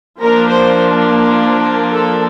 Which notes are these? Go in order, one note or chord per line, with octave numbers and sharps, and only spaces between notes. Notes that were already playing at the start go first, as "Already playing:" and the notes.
F3 A#3 D4 A#4
C5
A4